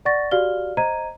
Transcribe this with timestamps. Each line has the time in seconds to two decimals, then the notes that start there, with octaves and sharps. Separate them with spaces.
0.05 D5 F#5 C#6 A6 A#6
0.31 F#4 G4 D5 F5 F6 G7
0.77 C5 D#5 A#5 G#6 D#7